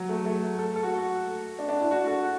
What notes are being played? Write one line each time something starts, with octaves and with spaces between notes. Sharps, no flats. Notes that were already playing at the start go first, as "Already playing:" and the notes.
Already playing: F#3
A3
A3
A4
A4
F#4
D4
D4
E4
F#4
A4
F#4